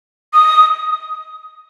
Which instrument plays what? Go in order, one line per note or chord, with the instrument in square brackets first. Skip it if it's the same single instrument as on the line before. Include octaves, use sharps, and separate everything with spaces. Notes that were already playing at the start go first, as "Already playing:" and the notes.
[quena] D#6